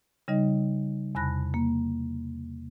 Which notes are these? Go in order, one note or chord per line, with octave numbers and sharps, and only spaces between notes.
C#3 G3 D#4 D#5
E2 C3 A5 B5 F#6 A#6
A#3